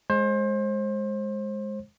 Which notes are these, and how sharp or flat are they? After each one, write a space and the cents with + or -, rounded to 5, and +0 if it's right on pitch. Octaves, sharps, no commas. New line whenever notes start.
G#3 +0 C5 +30